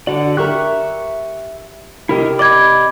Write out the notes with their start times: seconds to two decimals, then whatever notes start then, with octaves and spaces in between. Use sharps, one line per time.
0.07 D3 F#4 D5
0.37 G4 A#4 E5 C#6 F#6
2.09 C3 E4 G4 A#4 D#5
2.39 D5 D#5 B5 D6 G#6